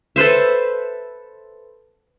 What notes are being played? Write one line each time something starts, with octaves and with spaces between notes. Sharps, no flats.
A4 B4 C5 E5